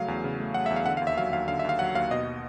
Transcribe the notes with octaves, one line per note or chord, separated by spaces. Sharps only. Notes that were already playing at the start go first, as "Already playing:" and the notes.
Already playing: C#3 F#3 A3 F5
E2
C#3
A3
F#3 F#5
E5
E2
F5
D3 F#5
F5
D#2
E5
F#3 F5
D#2 F5
D3 F5
E5
D#2 F5
F#3 F#5
D#2 F5
B2 D#5